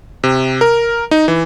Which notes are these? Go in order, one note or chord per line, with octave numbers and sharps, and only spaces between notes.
C3
A#4
D#4
E3